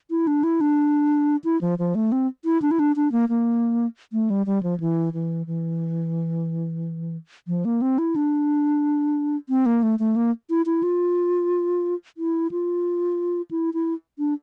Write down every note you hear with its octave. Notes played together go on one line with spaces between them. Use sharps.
E4
D4
E4
D4
E4
F3
F3
A3
C4
E4
D4
E4
D4
D4
A#3
A#3
A3
G3
G3
F3
E3
E3
E3
F3
A#3
C4
E4
D4
C4
A#3
A3
A3
A#3
E4
E4
F4
E4
F4
E4
E4
D4